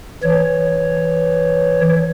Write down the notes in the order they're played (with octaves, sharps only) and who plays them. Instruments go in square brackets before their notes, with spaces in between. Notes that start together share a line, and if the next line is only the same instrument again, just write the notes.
[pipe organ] E3 C#5